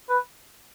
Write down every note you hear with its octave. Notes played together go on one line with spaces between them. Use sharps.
B4